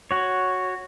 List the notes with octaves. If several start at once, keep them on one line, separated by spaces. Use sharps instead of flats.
F#4 C#5